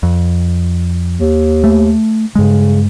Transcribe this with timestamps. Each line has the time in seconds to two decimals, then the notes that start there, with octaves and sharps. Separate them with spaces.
0.03 F2
1.19 D#2
1.64 A3
2.35 G2 C#3 G#3